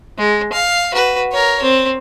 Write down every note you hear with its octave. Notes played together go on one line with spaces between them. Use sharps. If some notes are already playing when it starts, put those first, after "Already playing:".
G#3
F5
F#4 B4
A#4 C#5
C4